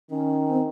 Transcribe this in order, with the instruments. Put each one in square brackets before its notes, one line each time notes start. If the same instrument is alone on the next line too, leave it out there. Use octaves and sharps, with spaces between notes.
[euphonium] D#3 [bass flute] C#4
[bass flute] C4